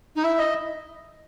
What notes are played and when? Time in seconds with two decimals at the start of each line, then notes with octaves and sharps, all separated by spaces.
0.15 D#4
0.23 E4 E5
0.38 D#5